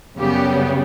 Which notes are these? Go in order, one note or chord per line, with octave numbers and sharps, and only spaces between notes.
F#2 C#3 G3 B3 G4